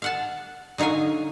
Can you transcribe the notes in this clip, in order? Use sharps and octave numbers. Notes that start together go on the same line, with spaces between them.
F5 F#5 A5
D3 D#4 C#5 F5 G#5